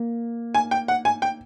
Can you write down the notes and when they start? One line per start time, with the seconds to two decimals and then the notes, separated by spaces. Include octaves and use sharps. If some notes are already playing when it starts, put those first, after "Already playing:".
Already playing: A#3
0.55 G#5
0.71 G5
0.88 F#5
1.05 G#5
1.22 G5